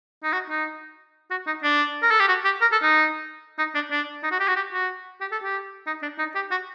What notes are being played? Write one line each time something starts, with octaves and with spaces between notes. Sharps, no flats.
D#4
F#4
D#4
F#4
D#4
D4
A#4
A4
G4
F#4
G4
A#4
A4
D#4
D#4
D4
D4
D#4
F#4
G4
F#4
G4
F#4
G4
A4
G4
D#4
D4
D#4
G4
F#4